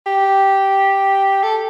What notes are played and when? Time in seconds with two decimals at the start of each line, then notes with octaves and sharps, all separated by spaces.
0.06 G4
1.43 A4